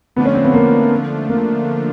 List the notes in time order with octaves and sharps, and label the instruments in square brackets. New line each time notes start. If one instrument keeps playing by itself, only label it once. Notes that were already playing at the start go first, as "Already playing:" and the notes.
[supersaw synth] D3 F3 A3 D4 F4 [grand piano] B3
[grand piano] C#4
C4
B3
A#3
A#3